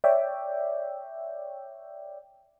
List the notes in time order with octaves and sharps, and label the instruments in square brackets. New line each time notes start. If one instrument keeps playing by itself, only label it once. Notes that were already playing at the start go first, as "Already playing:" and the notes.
[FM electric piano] C#5 D5 E5 G5